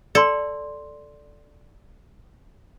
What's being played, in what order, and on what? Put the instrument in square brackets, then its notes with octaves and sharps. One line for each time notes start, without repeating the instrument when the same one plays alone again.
[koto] A4 [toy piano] D5 C6